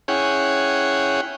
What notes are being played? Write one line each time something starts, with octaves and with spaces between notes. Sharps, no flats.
C#4 E4 G#4 C#5 F#5 G5